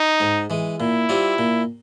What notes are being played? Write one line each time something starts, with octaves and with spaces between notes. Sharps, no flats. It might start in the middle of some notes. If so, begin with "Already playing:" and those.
Already playing: D#4
G#2
E3 G#3
A#2 E4
G3 C4 F4
A#2